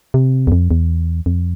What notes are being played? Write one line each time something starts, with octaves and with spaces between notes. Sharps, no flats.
C3
E2
F2
E2
F2